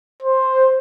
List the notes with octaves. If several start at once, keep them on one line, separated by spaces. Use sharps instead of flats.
C5